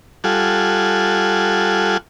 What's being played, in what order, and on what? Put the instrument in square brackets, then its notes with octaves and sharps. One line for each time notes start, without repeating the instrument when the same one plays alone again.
[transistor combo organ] G3 F4 A4 F#5 G#5